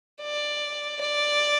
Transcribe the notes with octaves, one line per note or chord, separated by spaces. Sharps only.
D5
D5